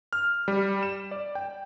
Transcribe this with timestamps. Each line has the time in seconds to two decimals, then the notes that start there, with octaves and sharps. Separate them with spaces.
0.13 F6
0.48 G3
0.83 E7
1.11 D5
1.35 G5